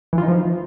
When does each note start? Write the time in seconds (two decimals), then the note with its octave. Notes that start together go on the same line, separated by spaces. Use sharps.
0.13 E3
0.18 F4
0.23 D#4
0.28 F3